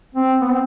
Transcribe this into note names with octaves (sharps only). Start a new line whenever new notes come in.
C4
B3
C4